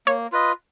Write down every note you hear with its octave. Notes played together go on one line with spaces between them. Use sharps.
A#3 C#5
F4 B4 D#5